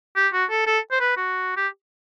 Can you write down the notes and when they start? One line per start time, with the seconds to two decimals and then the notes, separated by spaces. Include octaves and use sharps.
0.16 G4
0.33 F#4
0.50 A4
0.67 A4
0.91 C5
1.00 B4
1.17 F#4
1.57 G4